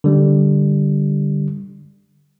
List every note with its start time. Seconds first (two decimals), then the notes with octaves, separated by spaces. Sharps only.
0.04 D3 G3